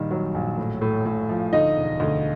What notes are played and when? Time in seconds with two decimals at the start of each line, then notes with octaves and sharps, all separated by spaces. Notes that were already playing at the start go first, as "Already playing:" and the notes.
Already playing: A#1 D#3 G3
0.11 F#3
0.34 A#1
0.58 A2
0.81 A2
1.06 A2
1.29 F3
1.53 D2 D#4 D#5
1.77 E1
2.00 D2